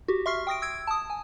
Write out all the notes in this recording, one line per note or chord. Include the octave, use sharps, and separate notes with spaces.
F#4 G4
E5 C6 C#6 F6 C7
G5 D#6 A#6 D7
E6 G#6 D7
A5 D#6
G#5